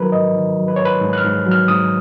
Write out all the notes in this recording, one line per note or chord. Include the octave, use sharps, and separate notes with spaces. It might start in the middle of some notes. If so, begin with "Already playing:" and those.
Already playing: D#3 F#3 A#4 B4
G#2 D#5
D#3
F#3
B4
G#2 C#5
B4
G#2
F#6
F6
G#2
F#3
F6
G#2 D#6